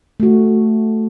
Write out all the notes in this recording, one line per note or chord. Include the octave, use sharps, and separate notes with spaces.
A3 F#4